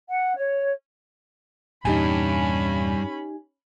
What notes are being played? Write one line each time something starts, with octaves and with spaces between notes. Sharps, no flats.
F#5
C#5
E2 G2 A#2 C#4 D#4 G4 G#5 B5